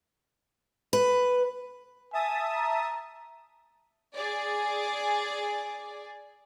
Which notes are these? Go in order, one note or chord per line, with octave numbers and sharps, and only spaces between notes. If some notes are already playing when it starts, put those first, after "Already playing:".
B4
E5 G#5 A5 D#6
A#5
G#4 D5